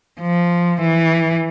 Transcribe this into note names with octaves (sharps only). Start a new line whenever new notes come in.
F3
E3